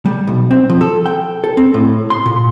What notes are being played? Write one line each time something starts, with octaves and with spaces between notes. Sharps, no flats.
G3
B1
C4
F3
A4
G5
A4
C4
A2
C6
A#2